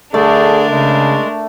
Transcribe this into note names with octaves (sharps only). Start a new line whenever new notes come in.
D3 A3 D4 G#4 A#4 D5
C#3 G#3